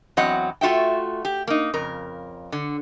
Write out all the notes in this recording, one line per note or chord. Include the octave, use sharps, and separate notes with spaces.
E2 F#3 C4 D#5 F#5
A3 F4 F#4 E5 G5
G4
A#3 D#4
F2 C#3 A#4
D3